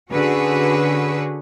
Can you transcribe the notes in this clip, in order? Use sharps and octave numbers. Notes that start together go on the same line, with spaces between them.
D3 C#4 F#4 G#4 B4